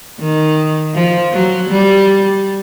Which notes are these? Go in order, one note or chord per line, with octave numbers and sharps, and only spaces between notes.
D#3
F3
F#3
G3